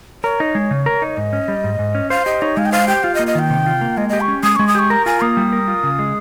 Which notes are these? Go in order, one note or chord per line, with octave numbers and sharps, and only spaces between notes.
A#4 C#5
D#4
G#3
C#3
A#4
D#4
G#2 D#5
C#4
G3
G#2
G#2
C#4
C5 F5
G4 D#5
D#4 C#5
G#3 F5
G5
C5 F5
G4 G5
F4 F5
D#5
A#3
D#5
D#3 G5
C3
F4
A#3
G#3 D#5
G4 D#5
C#6
C#4
G#3 D#6
G#3 C#6
D#6
G4 C#6
A#4 A#5
F4 G#5
A#3 D#6
G3
A#4
F4
C#3
G#3